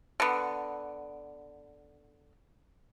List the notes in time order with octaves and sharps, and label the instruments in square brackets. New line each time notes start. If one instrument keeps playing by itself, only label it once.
[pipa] D3 B3